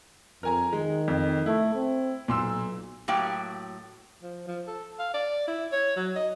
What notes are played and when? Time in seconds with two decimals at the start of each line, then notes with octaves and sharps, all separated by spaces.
0.43 F2 A#4 G#5 A#5
0.73 D#3 G#3
1.08 F2
1.46 A3 E4
1.75 C4
2.28 B1 A#2 C6 E6
3.08 A2 F#3 A#3 G4 G5
4.23 F3
4.48 F3
4.67 A4
4.99 F5
5.14 D5
5.47 E4
5.72 C#5
5.96 F#3
6.16 D#5